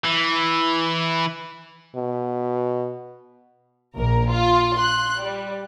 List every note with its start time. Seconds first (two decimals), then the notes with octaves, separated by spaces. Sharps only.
0.04 E3
1.96 B2
3.96 A#1 A#4
4.29 F4
4.76 C6 F#6
5.19 G3